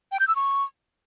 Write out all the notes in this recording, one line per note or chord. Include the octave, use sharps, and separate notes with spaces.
G5
G6
E6
C#6